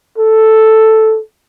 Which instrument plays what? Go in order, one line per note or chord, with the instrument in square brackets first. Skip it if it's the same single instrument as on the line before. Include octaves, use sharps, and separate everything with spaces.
[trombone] A4